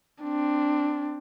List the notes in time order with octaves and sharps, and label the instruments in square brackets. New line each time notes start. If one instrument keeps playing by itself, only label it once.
[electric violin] C4 D4